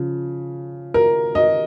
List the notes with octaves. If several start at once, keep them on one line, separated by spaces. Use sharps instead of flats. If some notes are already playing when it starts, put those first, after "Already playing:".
Already playing: C#3 F3
A#4
D#5